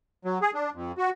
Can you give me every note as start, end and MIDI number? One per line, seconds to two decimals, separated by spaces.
0.25 0.38 54
0.42 0.51 68
0.54 0.70 62
0.75 0.92 41
0.98 1.10 66